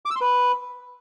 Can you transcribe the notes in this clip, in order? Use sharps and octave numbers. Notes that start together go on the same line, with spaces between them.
D6
E6
C6
B4